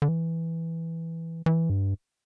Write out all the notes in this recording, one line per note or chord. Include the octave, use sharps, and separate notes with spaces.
D3
E3
E3
G2